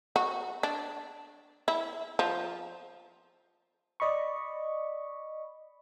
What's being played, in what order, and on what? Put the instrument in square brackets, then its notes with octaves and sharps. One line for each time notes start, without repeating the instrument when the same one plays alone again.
[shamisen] F#4
D4
E4
F3
[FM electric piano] D5 D#5 B5 C#6